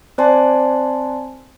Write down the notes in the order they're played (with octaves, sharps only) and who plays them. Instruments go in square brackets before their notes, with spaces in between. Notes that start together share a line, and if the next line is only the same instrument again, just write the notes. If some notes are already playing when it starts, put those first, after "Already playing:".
[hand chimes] C4 C5 D5 G#5 A5 C6